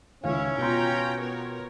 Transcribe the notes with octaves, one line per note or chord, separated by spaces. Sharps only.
C#2 D#3 C#4 E4 C#5 F5
B2 F4 G5 A#5 C6
B3 A#4 C#5